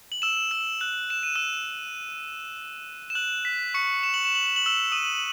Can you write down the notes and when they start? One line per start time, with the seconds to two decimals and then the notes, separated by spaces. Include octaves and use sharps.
0.12 F#7
0.22 E6 E7
0.51 E6 E7
0.81 F#6 F#7
1.10 E7
1.23 D#7
1.36 E6 E7
3.10 E7
3.15 F#6 F#7
3.45 B6
3.74 C#6 C#7
4.03 E7
4.14 F#7
4.25 E7
4.35 F#7
4.46 E7
4.56 F#7
4.66 E6 E7
4.92 D#6 D#7